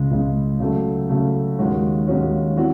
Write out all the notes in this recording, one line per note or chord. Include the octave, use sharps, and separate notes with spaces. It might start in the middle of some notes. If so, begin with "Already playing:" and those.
Already playing: C#2 C#3 G#3
C#2 C#3 G#3
C#3 F#3 A3
C#3 F#3 A3
D#2 D#3 G#3 C#4 F#4
D#2 D#3 G#3 C#4 F#4
E3 C4 F#4 C#5